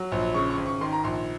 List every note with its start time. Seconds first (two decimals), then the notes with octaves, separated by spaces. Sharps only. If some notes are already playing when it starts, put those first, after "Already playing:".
Already playing: F#3
0.12 A#1
0.34 C#3 C#6
0.50 C#6
0.58 G#1
0.66 C#6
0.81 D#3 C6
0.93 A#5
1.04 A#1 C6